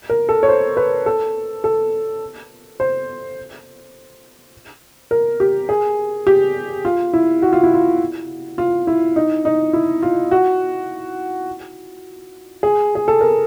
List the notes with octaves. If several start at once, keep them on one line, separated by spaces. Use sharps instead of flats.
A#4
A4
C#5
C5
B4
A4
A4
C5
A#4
G4
G#4
G4
F4
E4
F#4
F4
E4
F4
F4
E4
D#4
D#4
E4
F4
F#4
G#4
G#4
A4
A#4